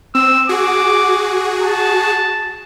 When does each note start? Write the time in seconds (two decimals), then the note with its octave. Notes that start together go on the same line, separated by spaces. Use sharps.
0.15 C4 E6
0.49 F#4 G#4 D6
1.62 A5